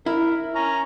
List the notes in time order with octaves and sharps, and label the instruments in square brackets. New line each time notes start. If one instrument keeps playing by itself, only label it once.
[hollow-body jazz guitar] E4 [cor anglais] A#4
[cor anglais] C#4 [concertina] A#5